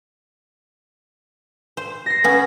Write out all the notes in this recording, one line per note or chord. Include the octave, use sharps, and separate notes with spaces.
C5
A#6 C7
B3 C#4